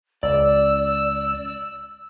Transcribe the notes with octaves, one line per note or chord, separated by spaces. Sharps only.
C#2 D5 E6